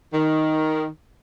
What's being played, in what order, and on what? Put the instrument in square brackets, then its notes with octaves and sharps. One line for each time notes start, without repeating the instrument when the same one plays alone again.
[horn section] D#3